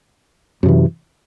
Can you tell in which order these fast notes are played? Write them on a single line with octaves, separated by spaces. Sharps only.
F#2 C3 E3